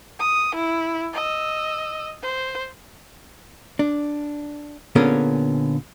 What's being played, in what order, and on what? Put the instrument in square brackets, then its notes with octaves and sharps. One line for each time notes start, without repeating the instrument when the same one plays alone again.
[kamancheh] D#6
E4
D#5 E6
C5
[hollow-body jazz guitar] D4
A#2 D3 B3 C#4 G#4 A#4